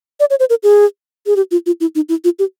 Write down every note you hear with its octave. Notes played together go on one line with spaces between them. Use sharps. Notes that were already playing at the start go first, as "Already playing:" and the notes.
D5
C#5
C5
A#4
G#4
G#4
G4
F4
F4
E4
D#4
E4
F4
G4